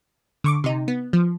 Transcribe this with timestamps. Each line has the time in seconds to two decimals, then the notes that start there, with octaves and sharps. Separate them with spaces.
0.44 D3 C#6 D6
0.64 C3 D#4
0.88 B3
1.13 F3